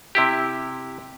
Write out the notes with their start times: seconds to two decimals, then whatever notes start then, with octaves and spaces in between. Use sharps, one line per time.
0.15 C3 E4 G4